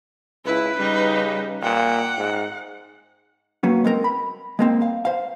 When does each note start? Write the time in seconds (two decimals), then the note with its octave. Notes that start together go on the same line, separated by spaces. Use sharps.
0.45 C#2 E4 B4
0.79 C#3 G3 D#4
1.62 A#2 F#5 G5
2.18 G#2
3.63 F#3 A#3 B3 C#4
3.84 G#3 C4 A#4
4.04 B5
4.59 G#3 A#3 C4
4.82 F5
5.05 C5 F5